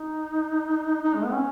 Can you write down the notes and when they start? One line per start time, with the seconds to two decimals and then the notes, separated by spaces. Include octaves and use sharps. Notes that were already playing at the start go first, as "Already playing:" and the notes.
Already playing: D#4
1.02 D#4
1.15 G#3
1.25 B3
1.34 C#4